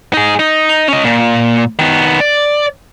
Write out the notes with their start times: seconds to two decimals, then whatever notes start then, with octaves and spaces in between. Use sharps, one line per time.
0.13 D#4 G#4
0.39 D#4
0.88 C#4 D#5
1.04 A#2
1.79 D#3 B3
2.20 D5